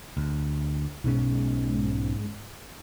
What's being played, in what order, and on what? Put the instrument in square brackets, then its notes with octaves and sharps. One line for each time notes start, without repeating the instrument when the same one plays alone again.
[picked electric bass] D2
[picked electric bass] B1 B2 C#4 [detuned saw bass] G#2